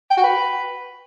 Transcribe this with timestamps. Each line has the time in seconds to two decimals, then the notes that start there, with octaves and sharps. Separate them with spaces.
0.11 G5
0.17 F#4
0.24 B4